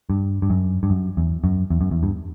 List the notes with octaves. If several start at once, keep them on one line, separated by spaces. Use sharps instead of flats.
G2
G2
F#2
G2
F#2
E2
F#2
E2
F#2
E2
G2